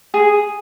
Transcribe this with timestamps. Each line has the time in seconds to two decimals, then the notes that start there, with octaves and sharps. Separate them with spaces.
0.14 G#4